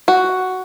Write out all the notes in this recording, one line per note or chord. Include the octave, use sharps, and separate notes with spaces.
F#4